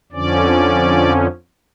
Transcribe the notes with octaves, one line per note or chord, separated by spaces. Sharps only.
F2 D3 F3 C#4 D5